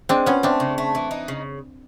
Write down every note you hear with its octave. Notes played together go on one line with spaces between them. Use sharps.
G#3 C4 D4
B3 C#4 F4
A3 C4 D4
C#3
A3
E3
D#4
C#3